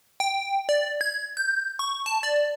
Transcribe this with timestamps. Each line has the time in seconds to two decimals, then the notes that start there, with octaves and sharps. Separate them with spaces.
0.20 G5
0.69 D5
1.01 G#6
1.37 G6
1.79 C#6
2.06 A5
2.23 D5